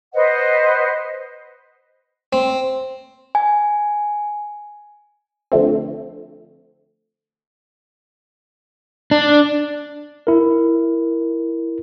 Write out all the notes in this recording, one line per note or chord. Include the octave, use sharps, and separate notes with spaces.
B4 C5 D#5 F#5
C4
G#5
D3 F3 A3 C4
D4
E4 A#4